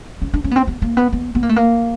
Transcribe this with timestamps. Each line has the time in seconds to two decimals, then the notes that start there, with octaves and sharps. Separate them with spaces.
0.22 C#4
0.34 D4
0.44 C#4
0.51 B3
0.56 C4
0.67 B3
0.82 A#3
0.97 B3
1.13 B3
1.35 B3
1.43 A#3
1.49 A3
1.56 A#3